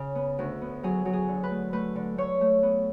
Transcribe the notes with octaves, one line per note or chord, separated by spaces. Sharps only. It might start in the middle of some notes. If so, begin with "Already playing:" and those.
Already playing: C#3
B3
D2
B3
F#3 G#4
F#3
G#4
D3
B4
A3
A3 B4
D3
A3 C#5
A3
B3